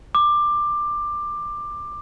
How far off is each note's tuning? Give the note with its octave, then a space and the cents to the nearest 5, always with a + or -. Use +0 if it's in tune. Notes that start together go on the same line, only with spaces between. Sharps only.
D6 +15